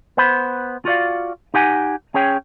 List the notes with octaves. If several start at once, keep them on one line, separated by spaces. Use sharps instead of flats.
B3 C5 B5
F4 F#4 D5 F5
D#4 G4 F#5 G#5
C#4 G#4 C#5 G5